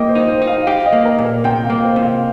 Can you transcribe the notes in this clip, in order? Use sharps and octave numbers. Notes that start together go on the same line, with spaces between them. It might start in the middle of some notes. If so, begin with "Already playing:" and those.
Already playing: A#3 D#5 G5
C5
D#4
C5
D#4
F5
G4 F5
D#5
A#3
A#4
A#2
A#4
C3 G5
F5
A#3
C5
C3
F5